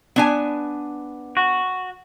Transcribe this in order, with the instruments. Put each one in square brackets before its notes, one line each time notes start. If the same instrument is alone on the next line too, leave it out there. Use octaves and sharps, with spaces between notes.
[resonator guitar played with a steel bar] B3 D4 G#5
[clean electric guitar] F#4